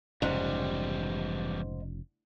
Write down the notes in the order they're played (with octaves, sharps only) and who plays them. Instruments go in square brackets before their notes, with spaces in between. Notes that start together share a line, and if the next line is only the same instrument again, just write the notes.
[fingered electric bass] F1 C#3 [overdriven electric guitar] E2 G3 [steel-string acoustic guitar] G#2